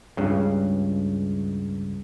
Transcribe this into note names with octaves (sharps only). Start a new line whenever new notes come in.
C#2 G2 C#3